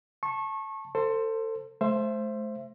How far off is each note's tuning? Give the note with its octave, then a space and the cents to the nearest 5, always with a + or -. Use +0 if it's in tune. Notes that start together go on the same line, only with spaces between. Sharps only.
A5 +0 C#6 -25
A4 +30 C5 +0
A3 -40 C5 +5 E5 +35